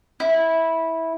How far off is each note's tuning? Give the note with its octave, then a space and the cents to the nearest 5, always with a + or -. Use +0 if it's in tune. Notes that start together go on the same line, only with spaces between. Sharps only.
E4 -15